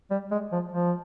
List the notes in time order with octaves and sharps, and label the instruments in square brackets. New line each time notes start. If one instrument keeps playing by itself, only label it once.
[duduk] G3
G#3
F3
F3